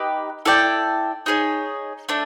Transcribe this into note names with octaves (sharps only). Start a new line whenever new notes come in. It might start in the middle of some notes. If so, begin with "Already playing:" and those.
Already playing: D#4 G4 B4
E4 A4 D5 G5
D#4 G#4 C#5
A3 D4